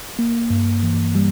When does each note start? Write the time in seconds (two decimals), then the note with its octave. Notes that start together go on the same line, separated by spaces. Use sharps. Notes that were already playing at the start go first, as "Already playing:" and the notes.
0.19 A#3
0.50 G2
0.83 E3
1.15 G3